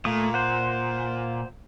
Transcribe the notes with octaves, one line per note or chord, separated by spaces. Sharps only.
A#2 A3 D#6
C5 F#5